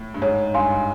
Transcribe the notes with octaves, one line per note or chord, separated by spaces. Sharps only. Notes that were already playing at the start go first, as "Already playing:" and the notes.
Already playing: A2
G2
G#2 C#5
G2 F5 G#5 C6